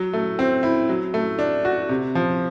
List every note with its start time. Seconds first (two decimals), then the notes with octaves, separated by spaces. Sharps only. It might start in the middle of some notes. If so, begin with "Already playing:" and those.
Already playing: F#3
0.13 A3
0.39 C4
0.63 E4
0.89 F#3
1.14 A3
1.39 D4
1.65 F#4
1.89 C3
2.15 F3